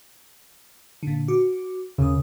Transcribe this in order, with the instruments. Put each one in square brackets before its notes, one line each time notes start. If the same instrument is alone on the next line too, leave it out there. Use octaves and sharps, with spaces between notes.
[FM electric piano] A#2 D3
F#4 D6
[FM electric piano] D#2 D#6 [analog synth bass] C#3